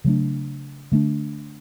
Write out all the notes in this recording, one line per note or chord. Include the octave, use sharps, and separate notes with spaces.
C#3 F#3 A3 D4
D3 A3 D4